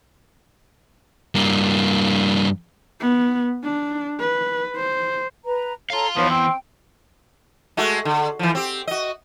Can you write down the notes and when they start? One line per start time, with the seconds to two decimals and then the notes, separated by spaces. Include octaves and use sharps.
1.35 G2 A#3
3.01 B3
3.64 D4
4.20 B4
4.76 C5
5.45 B4 A#5
5.90 A4 C#5 F5 A#5 C6
6.17 E3 F3 B3 D#4 B4 C#5
6.30 C4 G5
7.77 G#3 A3 F#4
8.05 D3
8.39 E3 F3
8.55 C4 G4
8.87 F#4 D#5